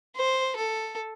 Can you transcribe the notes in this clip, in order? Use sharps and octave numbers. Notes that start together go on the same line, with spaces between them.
C5
A4